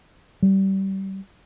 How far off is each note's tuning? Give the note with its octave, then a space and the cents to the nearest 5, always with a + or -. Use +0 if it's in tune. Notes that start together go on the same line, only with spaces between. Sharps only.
G3 -25